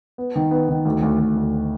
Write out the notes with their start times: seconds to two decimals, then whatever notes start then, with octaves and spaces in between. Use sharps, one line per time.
0.18 B3
0.36 D#3
0.51 B3
0.69 D#3
0.85 D2
1.03 D2
1.19 D2
1.36 D2